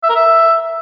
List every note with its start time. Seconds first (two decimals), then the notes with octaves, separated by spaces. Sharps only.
0.03 E5
0.09 A#4
0.15 E5